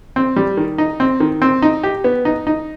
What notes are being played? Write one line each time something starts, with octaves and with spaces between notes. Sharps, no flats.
C4
G3
D#3
D#4
C4
D#3
C4
D#4
G4
B3
D#4
D#4